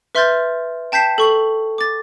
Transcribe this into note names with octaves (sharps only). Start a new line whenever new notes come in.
B4 E5 C6 F6 G6 A6
G5 A5 G6 B6 C7 E7
A4 C#6 F#7
D6 A6